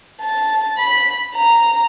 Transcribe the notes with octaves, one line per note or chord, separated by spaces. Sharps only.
A5
B5
A#5